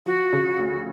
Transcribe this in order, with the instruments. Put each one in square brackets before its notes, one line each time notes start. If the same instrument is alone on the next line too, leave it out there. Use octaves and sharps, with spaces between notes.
[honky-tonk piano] F3 [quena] F#4
[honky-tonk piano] C#3
D2